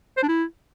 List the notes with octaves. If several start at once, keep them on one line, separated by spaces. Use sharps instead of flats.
C5
D4
E4